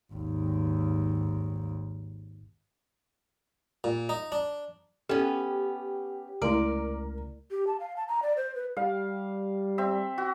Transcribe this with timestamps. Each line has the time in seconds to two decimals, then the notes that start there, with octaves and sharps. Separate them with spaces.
0.13 G#1 D#2
3.84 A#2
4.09 D#4
4.32 D4
5.09 B3 C#4 G4 A4
6.42 C#2 A3 E4 A#4 D5
7.51 G4
7.67 A5
7.80 F5
7.97 A5
8.08 A#5
8.23 D5
8.37 C5
8.55 B4
8.77 G3 F5
9.78 C4 E5
10.18 F#4